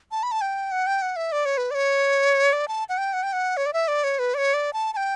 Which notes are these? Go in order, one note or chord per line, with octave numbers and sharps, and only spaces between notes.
A5
B5
A5
G5
F#5
G5
F#5
E5
D5
C#5
B4
D5
C#5
D5
A5
F#5
G5
F#5
G5
F#5
C#5
D5
E5
D5
C#5
B4
D5
C#5
D5
A5
A5
G5